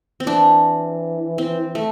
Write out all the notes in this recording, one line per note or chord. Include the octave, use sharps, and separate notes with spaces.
C4
E3 D4
C4
A3